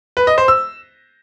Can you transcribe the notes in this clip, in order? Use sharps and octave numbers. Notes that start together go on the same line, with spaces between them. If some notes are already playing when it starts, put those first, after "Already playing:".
B4
D#5
C5
E6